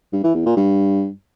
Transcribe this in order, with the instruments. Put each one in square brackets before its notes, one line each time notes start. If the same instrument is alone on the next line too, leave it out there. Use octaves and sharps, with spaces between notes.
[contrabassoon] G2
E3
E2
A#2
G2